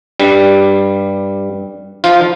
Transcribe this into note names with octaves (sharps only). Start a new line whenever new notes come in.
G2 G3
F3 F4